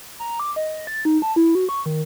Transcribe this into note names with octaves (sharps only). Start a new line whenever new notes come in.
A#5
D6
D#5
A6
D#4
A5
E4
F#4
C#6
D#3